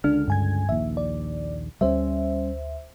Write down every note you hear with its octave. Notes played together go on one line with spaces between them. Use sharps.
C#2 D3 D4 F6
G2 G#5 G#6
A#1 D#2 E5
D5
D2 G3 A#3 C#4 C5 E5